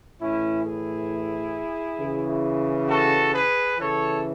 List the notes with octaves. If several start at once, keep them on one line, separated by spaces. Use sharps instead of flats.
A2 E3 C#4 E4
E4 G#4
C#3 E3
F#4 A4
G#4 B4
C#3 E3 A4 C#5